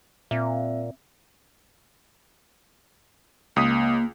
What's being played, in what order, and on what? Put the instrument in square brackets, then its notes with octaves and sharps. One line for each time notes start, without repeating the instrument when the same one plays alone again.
[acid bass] A#2 [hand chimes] C4 E5
[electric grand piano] C#2 D#6 B6 [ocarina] A#3